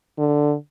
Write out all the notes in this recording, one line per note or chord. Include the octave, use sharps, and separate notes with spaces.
D3